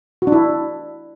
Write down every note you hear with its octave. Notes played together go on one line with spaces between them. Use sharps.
F#4
D4
E4